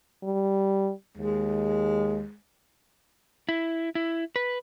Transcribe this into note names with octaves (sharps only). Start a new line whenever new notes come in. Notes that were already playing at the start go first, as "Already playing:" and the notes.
G3
D#2 G#3
E4
E4
B4